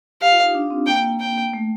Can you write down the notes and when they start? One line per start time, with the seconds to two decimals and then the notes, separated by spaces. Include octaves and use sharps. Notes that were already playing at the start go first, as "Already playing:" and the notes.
0.21 G4 F5
0.32 F4
0.43 D#4
0.55 D4
0.70 C4
0.87 A#3 G5
1.20 G5
1.53 A3